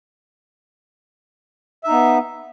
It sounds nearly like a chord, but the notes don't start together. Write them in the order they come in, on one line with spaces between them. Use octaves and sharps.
E5 D#4 B3